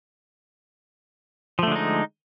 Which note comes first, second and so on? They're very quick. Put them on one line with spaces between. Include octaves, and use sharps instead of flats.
F3 A3 D3 G#3 D#4